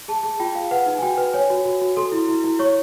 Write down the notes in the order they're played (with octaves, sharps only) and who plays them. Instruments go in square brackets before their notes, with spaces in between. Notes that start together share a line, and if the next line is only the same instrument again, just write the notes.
[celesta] G#4 A5
G#4
F4 G5
G#4 F5
B4 F#5
D#4
G#5
F#4 G5
B4
C#5 G#5
F#4
F#4
F#4
A4 C6
E4
E4
E4
C#5 C#6